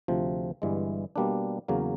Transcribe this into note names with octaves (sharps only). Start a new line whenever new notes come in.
D2 C3 F3
G1 G2 E3 G#3
B2 G3 A#3 D4
E2 C#3 F#3 A#3